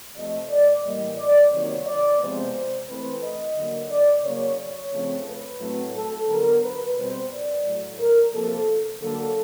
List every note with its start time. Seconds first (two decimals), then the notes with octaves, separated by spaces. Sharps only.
0.15 C3 F3 A3 D#5
0.49 D5
0.83 A2 E3 G3 A#3 D#5
1.17 D5
1.51 C3 D#3 F#3 A#3 C#5
1.85 D5
2.19 C3 F3 G#3 B3 C5
2.87 E3 A3 C4 B4
3.22 D#5
3.56 D3 F#3 A#3
3.90 D5
4.23 C#3 F#3 A#3 C#5
4.58 C#5
4.92 C#3 F3 A3 C4
5.26 B4
5.60 A2 F#3 A3 C4
5.94 A4
6.28 D3 F#3 B3 A#4
6.62 B4
6.96 B2 G3 C4 C5
7.30 D5
7.65 A2 F#3 A3
7.99 A#4
8.32 C3 F3 A#3 A4
9.00 D3 F#3 A#3 A4